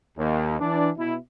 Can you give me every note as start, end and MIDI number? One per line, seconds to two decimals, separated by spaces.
0.18 0.57 39
0.59 0.90 52
0.59 0.90 62
0.59 0.90 74
0.97 1.15 47
0.97 1.15 64